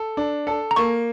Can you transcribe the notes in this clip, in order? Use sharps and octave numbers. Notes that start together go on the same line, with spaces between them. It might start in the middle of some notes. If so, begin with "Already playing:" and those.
Already playing: A4
D4
A4
A#5
A#3 C#6